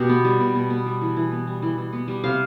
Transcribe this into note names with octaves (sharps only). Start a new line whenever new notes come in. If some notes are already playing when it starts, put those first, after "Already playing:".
Already playing: B2 G4
B3
G3
B2
B2
B3
G3
E3
E3
B3
G3
E3
E3
B3
G3
C3 F5